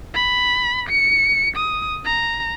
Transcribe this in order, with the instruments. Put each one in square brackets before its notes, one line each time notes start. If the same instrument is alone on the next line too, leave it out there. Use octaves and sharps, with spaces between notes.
[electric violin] B5
C#7
D#6
A#5